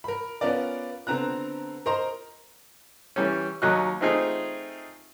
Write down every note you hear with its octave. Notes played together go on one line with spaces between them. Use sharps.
A#4 B5
B3 C#4 F4 A#4 D5
D3 B3 C4 A#5 F#6
A#4 C5 D#5 A#5 C6
E3 G3 C#4
D#2 F#3 D#5 C#6 F#6
A3 C4 D#4 F4 G#4